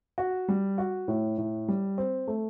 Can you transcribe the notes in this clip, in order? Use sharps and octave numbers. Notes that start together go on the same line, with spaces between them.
F#4
G3
F#4
A2
A2
G3
C4
A3